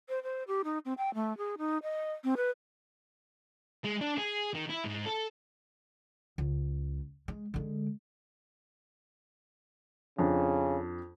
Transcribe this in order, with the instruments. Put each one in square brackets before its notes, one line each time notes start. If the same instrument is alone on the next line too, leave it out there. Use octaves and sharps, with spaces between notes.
[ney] C5
C5
G4
D#4
C4
G5
A3
G#4
D#4
D#5
C4
B4
[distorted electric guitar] G#3
D4
G#4
D#3
E4
G#2
A4
[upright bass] C#2
G#3
D3 G#3
[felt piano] F2 D4 [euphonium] C#3